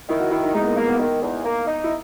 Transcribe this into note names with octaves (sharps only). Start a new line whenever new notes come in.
D#3 E4
F#4
D#3 E4
D#4
G#3 D#4
B3
A#3
A#3 B3
B3
D#3 D#4
E2
A#3
D#4
E4